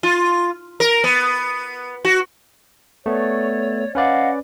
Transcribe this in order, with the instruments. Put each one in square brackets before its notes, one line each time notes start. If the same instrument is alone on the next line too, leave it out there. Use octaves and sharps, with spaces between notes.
[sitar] F4
A#4
B3
F#4
[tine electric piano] A3 B3 [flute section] C#5 D5
[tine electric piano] C#4 B4 D5 [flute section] D#5 F5 F#5